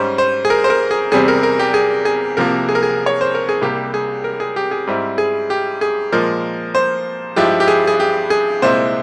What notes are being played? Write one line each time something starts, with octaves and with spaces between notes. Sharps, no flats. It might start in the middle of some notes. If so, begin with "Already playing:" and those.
Already playing: G#2 G3 C#4 C5
C5
G#4
A#4
C5
A#4
G#4
E2 C3 G3 C4 G#4
A#4
A#4
G4
G#4
G#4
C2 C3 F3 A#3 A#4
G#4
A#4
G#4
C#5
C5
A#4
G#4
C2 C3 G3 A#3 G4
G#4
A#4
G#4
G4
G#4
G#2 G3 C4 E4
G#4
G4
G#4
A#2 F3 G#3 A#4
C5
G2 F3 G#3 E4 G4
G4
G#4
G#4
G4
G#4
C2 A#2 G#3 E4 C5